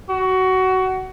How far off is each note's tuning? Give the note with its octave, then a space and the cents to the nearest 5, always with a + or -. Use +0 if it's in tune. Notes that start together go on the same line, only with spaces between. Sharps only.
F#4 +20